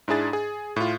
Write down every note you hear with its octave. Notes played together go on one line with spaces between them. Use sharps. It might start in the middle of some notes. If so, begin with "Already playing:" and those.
G#2 D4 E4 G#4 A6
G#4
A2 F4